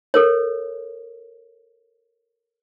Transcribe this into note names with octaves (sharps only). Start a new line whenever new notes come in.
A4 A#4 C#5